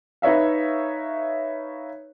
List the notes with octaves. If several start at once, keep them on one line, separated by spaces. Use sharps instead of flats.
D#4 B4 C#5 E5 F5